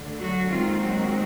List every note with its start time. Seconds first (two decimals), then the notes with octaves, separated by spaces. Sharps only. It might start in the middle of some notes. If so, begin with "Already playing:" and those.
Already playing: D2 D3
0.20 F#3 F#4
0.49 D#2 D#3 G#3 C4 D#4 F4
0.79 F#3 F#4